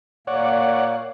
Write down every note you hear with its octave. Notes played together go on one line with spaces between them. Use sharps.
A#2 A#3 C#5 D5 F#5